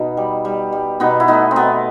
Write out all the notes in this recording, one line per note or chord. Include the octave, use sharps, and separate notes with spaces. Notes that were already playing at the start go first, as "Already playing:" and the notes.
Already playing: B2 B3 D#4
G3
G3
G3
B2 B3 D#4
E4
A3 B3 D#4
C4
B2 B3